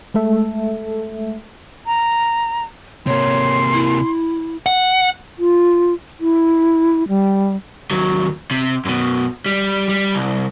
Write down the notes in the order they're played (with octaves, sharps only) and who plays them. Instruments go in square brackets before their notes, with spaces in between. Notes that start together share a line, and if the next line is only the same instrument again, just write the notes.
[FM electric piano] G#3 A3 A4 E5
[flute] A#5
[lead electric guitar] C3 A#3 [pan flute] C#5 [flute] C6
[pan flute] E4
[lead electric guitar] F#5
[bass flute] F4
E4
G3
[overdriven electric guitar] D#2 F#3
C3
F#2 B2
G3
G3
C2